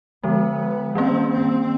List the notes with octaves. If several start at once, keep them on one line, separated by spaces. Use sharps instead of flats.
D3 F3 G#3 B3
D#3 G3 A#3 C4 C#4
C4